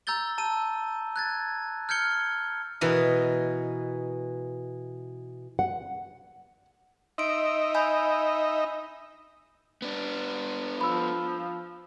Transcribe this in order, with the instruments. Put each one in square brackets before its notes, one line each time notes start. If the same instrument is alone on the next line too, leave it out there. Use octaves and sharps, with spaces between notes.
[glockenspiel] A#5 E6 G6 A6 G7
A5 E6 D#7
F#6 G#6 A6
F6 G6 G#6 C#7 G7
[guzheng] B2 E3 A#4 D#5
[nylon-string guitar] F#5
[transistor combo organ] D#4 D#5 E5 [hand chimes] C6 D7
[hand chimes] G#5 B5 G6
[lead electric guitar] B3 D4
[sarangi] F3 [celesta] B5 E6